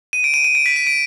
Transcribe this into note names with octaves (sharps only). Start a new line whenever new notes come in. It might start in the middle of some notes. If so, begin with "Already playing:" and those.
D#7
D7
D#7
D#7
D7
B6
D#7
D7